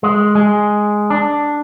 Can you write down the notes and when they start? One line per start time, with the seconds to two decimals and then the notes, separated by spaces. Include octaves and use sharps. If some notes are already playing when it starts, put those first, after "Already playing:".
0.03 G#3
0.35 G#3
1.10 D4